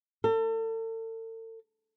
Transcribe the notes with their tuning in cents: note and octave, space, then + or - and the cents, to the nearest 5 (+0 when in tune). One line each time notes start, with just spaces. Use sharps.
A4 +40